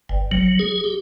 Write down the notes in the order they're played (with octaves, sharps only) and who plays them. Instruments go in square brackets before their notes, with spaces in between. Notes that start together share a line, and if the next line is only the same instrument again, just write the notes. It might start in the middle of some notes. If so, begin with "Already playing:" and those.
[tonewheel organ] G1
F#3
G#4
G4